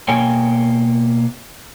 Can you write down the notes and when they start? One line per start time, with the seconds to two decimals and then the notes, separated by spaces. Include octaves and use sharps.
0.08 B2 A#3 C#5 G5 G#5